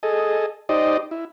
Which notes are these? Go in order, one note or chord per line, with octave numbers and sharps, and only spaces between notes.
G#4 A4 D#5
D#4 G4 C5 D5 D#5
E4